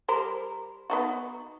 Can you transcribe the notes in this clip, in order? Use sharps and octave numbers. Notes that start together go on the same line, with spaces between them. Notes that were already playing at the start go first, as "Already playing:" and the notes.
G3 A#4 C5
B3 D#4 F#4